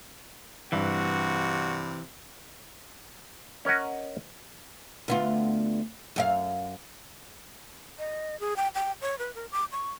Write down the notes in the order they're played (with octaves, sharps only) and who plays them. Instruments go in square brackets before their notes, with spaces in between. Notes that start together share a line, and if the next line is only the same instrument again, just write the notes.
[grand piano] G2 [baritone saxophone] C3 [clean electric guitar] E3 [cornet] F#4
[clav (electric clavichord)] C#4 A#4 D#5 F#5
[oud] D2 B3 F4
F#2 G4 F5
[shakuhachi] D#5
G#4
G5
G5
C#5
B4
A#4
D6
C#6